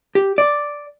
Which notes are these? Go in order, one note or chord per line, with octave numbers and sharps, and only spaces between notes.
G4
D5